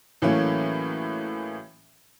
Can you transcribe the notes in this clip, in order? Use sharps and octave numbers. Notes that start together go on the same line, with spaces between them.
A2 E3 F#3 A3 A#3 C#4